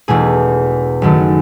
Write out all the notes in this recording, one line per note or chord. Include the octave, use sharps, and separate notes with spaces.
E1 E2 B2 A3 G#4
F#1 F#2 D#3 F#3 A3